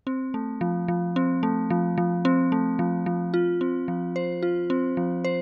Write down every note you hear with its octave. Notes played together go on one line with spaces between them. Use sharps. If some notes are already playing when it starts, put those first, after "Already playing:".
C4
A3
F3
F3
C4
A3
F3
F3
C4
A3
F3
F3
F4
C4
F3
C5
F4
C4
F3
C5